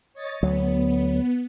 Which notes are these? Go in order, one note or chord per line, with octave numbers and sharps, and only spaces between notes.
C#5 D#5 A6
D2 F#3 B3